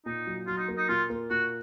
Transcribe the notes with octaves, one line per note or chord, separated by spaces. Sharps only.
A#2 D#4
F#3
F#3 F4
D#4
A#3
D#4
A#2 F4
A#3
A#2 F#4